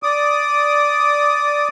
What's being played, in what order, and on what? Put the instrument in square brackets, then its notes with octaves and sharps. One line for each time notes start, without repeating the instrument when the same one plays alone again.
[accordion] D5 D#6